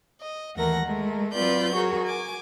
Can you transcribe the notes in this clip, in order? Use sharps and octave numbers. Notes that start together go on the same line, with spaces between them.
D#5
D#2 E3 A3 A#4 F#5 A#6
G#3 A3 A#4
F#3 C4 F4 B4 D5 G6
F#4 G#4 A#4 C#5
G#5 D6